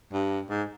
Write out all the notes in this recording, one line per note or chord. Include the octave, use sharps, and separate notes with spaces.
G2
G#2